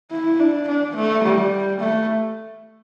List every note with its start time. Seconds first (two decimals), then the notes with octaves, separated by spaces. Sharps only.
0.11 E4
0.40 D4
0.68 D4
0.96 A3
1.23 G3
1.79 A3